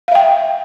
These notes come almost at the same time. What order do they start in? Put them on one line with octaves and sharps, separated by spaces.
F5 E5 G5